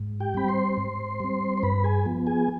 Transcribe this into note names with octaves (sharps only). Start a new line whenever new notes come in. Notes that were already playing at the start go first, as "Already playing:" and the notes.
Already playing: G#2
G4 G5
G3 C4 B5
C5 C6
G#2
G3 C4
C6
G2 B4 B5
G#4 G#5
F3 B3
G#4 G#5